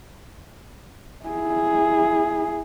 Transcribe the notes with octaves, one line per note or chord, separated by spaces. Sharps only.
E4 G#4